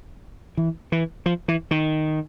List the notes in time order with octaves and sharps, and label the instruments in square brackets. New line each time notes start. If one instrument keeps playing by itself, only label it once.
[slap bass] E3
E3
F3
E3
D#3